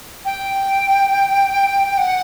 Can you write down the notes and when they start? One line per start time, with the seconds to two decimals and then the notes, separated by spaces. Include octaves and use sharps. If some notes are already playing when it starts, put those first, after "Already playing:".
0.25 G5
1.97 F#5